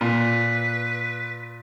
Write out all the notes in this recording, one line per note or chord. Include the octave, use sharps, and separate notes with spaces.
A#2 B4